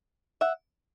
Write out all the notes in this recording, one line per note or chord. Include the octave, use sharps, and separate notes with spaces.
E5 F#5